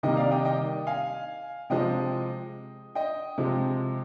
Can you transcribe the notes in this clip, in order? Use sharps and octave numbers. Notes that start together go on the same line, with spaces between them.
C3 D#3 G3 A#3 D#5 G5
D5 F5
D#5 G5
D#5 G5
F5 G#5
C3 F3 G#3 D#5 G5
D#5 G5
C3 F3 G#3